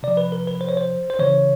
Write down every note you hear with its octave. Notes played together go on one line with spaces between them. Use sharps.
C3 F3 D5
B4
A#4
B4
C5
C#5
C5
C5
C#3 E3 C#5